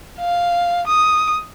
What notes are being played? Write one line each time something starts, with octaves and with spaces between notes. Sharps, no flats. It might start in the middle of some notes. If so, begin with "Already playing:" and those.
F5
D#6